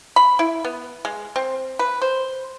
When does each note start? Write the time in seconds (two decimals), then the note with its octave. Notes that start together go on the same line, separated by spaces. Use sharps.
0.16 B5
0.39 E4
0.64 B3
1.05 G#3
1.36 C4
1.79 B4
2.02 C5